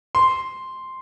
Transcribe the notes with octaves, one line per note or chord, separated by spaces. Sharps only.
C6